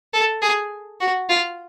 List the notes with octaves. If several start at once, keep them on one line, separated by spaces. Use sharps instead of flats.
A4
G#4
F#4
F4